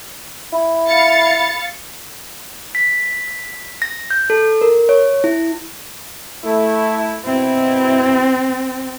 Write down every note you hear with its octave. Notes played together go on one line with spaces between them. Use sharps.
E4 B5
F5 A6 C#7
B6
A#6
G6
A4
A#4
C#5
E4
A3 E4
B2 C4 E4